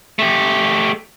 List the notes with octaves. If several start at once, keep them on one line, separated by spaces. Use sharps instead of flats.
A3 G4